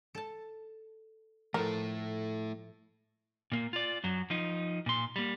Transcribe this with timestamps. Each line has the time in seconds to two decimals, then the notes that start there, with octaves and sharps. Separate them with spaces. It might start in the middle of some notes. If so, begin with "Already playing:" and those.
0.15 A4 A5
1.54 A2 F3 A3 E4 A#4
3.52 A#2 A#3
3.73 F4 D5
4.04 F#2 F#3
4.30 F3 D#4
4.86 A#2 C6
5.16 G3 A#3